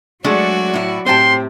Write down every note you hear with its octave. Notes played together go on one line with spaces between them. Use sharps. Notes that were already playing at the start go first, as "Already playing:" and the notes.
F#3 G#3 A3 D4 F#4 D5
A2 E4
A2 C3 C5 G5 A5 C6